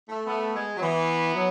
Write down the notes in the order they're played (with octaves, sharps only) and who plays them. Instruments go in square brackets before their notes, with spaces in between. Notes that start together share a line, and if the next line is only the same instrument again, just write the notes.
[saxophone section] A3
[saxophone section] A3 [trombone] B3
[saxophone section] G#3
F#3
[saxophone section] E3 [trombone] B3
[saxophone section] F#3